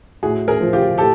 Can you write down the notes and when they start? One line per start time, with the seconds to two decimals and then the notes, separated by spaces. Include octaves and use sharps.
0.23 A2 F#4 G#4
0.48 G#4 A#4
0.61 F3
0.73 F4 G4
0.98 A2 G4 A4